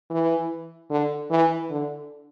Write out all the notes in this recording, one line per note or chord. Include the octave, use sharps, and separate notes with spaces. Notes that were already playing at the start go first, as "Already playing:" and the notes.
E3
D3
E3
D3